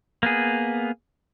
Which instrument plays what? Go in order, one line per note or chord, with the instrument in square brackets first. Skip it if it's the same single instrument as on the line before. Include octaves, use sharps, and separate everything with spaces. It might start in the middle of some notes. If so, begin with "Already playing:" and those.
[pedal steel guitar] A#3 B3 G#4